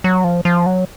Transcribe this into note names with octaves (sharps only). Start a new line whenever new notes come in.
F#3
F3
F3
F#3